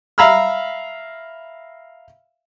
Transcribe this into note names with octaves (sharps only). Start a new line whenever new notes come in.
E5 F5 A#5 B5 E6 F6